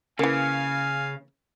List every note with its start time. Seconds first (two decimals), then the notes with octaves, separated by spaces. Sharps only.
0.19 C#3 E3 A#3 F5 G#5 F6